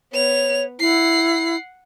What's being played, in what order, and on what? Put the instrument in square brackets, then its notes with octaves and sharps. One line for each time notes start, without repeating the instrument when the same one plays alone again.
[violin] B3 F7 [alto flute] C#5
[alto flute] E4 [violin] F#5 C7